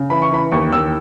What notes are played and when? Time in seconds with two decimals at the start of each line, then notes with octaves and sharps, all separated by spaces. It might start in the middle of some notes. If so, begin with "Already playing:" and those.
Already playing: C#3
0.10 E3 B5
0.22 C#6
0.31 E3 B5
0.52 D#2 C#6
0.72 D#2 E6